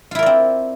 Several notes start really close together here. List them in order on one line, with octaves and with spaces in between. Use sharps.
F4 E4 A#4 D5 C4